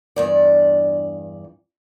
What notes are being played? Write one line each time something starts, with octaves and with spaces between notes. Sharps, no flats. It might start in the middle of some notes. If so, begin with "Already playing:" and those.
E2 G2 D5